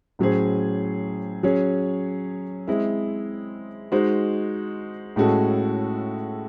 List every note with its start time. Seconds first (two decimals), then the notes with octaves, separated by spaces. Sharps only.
0.19 A2 F#3 C#4 G#4 C5
1.43 F#3 C#4 G#4 C#5
2.68 G#3 C4 E4
3.92 G#3 D#4 F#4 C5
5.16 A2 G#3 C#4 F#4 A4